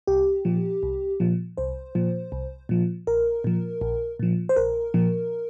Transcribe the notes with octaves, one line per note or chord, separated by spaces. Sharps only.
C2 G4
A#2 F3
C2
A#2 F3
C2 C5
A#2 F3
C2
A#2 F3
A#1 A#4
A#2 F3
A#1
A#2 F3
C5
A#1 A#4
A#2 F3